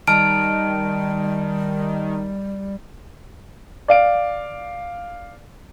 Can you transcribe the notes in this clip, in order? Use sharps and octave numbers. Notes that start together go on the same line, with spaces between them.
D#3 G3 A5 F6 D7
D5 F5 D7